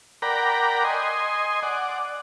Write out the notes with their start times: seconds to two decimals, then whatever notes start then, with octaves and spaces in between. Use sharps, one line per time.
0.22 A#4 D5 F#5 G5 A#5 B5
0.84 D#5 G#5 C6
1.63 D5 F#5